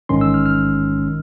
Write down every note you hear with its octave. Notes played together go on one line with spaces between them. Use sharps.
A1 G#2 D#3 G#3 C#4 C6
E6
F6
F6
D#3